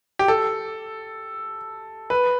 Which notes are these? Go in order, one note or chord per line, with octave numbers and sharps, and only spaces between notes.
G4
A4
B4